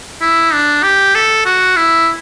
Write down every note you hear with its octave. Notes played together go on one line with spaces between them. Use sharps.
E4
D4
G4
A4
F#4
E4